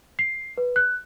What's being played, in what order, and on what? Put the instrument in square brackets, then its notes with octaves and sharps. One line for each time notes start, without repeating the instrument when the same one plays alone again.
[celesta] C7
B4
F#6